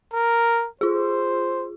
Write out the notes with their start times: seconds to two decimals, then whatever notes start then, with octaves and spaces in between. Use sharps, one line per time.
0.14 A#4
0.81 F4 G#4 C5